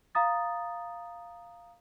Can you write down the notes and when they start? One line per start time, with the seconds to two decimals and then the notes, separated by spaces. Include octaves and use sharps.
0.15 F5 A#5 D#6 A6